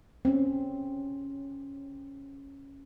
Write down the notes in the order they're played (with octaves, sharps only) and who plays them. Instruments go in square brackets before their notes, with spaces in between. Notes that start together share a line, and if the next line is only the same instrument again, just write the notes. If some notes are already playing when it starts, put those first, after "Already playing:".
[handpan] C4 C#4